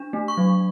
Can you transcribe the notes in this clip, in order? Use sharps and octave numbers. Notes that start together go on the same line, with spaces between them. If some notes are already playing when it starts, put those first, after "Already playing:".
Already playing: D4
A3
C#6
F#3